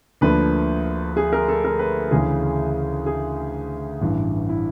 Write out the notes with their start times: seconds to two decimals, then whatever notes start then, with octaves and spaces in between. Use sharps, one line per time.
0.21 D2 D3 F3 A#3 B4
1.17 G#4
1.33 A#4
1.48 A4
1.65 A#4
1.79 B4
2.11 D2 C#3 E3 G#4
3.06 G#4
4.01 A1 G2 E3
4.49 E4